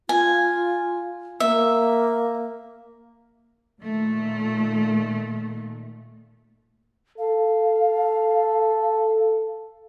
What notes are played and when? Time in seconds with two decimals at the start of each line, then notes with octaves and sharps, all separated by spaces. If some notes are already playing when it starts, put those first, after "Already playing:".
0.09 F4 G#5
1.40 A#3 E5
3.81 A#2 D#3 A3
7.18 A4 F5